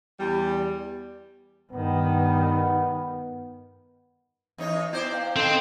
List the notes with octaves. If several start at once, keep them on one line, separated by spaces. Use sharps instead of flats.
E2 G3
G2 D#3 B3
E2 D#4 C#5
B3 E4 C5 D5 D7
F5 G5 G#6
D#3 C4 A4 C5 G5 G6